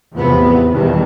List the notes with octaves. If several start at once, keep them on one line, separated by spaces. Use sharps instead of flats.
A1 E2 C3 F3 B3
E2 B2 D#3 G3